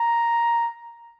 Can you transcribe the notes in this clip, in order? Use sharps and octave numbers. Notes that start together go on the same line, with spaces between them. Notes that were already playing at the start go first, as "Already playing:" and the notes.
Already playing: A#5